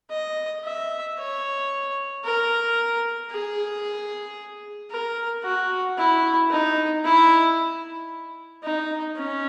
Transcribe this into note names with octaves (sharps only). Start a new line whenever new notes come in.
D#5
E5
C#5
A#4
G#4
A#4
F#4
E4
D#4
E4
D#4
C#4